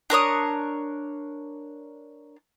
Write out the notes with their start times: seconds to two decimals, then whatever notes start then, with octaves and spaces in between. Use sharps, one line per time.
0.10 D4 A#4 C#5 D#6